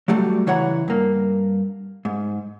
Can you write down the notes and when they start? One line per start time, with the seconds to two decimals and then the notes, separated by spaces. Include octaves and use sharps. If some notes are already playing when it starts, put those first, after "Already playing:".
0.08 F#3 G3 A3 F#4
0.47 C#3 E3 C#5 F#5 A#5
0.88 G2 A#3
2.05 G#2